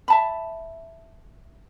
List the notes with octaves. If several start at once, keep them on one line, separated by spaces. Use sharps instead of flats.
E5 A5 B5